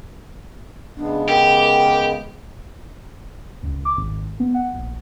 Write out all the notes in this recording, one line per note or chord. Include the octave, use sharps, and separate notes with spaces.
C#3 G#3 B3 D4
G4 A#4
C#2
D6
G#1
B3
F#5
A#1